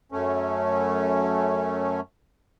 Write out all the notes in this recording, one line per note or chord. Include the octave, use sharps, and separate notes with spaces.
F#2 A3 C#4